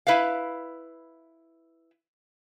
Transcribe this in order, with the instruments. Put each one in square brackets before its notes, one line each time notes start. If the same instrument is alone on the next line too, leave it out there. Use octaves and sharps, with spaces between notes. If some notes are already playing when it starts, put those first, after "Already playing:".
[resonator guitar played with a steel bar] E4 B4 E5 F5